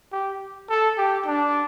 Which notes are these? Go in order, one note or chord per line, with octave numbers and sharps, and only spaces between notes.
G4
A4
G4
D4